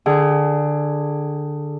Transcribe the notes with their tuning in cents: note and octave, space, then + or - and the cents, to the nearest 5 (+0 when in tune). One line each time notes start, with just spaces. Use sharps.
D3 +15 G#4 +0 F#5 +45